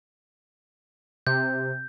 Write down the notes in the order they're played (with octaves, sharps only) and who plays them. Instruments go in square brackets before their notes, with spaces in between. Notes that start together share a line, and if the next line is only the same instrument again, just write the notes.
[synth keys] C3 [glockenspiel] G6